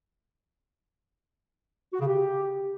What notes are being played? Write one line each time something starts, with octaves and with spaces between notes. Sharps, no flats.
F#4
C#3
G4